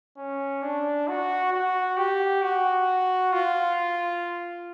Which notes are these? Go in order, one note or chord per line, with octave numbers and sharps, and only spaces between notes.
C#4
D4
F#4
F#4
G4
F#4
F4